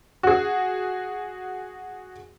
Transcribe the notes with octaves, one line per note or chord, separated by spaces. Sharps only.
F#4 G#4